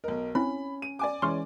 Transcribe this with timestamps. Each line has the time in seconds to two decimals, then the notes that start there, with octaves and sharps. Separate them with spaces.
0.04 B1 A#4 D#5
0.35 C4 C#4 E4 B5
0.82 D#7
0.99 D5 G#5 D6
1.22 E3 G#3 C#4 C6 C#6 F6